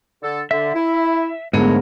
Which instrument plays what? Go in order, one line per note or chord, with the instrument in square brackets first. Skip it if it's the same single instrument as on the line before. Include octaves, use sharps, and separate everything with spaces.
[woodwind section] D3 A4
[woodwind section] D3 [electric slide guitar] E5
[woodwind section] E4
[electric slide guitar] G#2 D3 [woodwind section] F3 F#3 A#4 [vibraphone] A3 B3 G#4